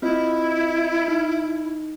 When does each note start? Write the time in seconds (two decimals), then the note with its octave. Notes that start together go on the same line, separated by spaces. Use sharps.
0.02 C4 E4 F4 D#5
1.08 D#4